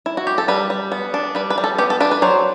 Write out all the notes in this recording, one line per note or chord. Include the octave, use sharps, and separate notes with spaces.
E4
F#4
G4
A4
G3 B4
G3
B3
D4
G3 B4
B4
G3
A4
B3 G4
A4
D4 B4
B4
F#3 C5